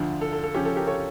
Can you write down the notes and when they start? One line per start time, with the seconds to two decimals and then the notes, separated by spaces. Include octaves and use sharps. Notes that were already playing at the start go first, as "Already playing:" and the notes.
Already playing: D2 D3 F3
0.21 A4
0.32 A4
0.44 A4
0.54 C#3 F3 C#4 G4
0.65 A4
0.76 G4 A#4
0.87 A4 C#5